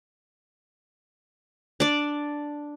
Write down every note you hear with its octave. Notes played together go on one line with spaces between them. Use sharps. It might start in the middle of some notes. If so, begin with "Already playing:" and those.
D4 D5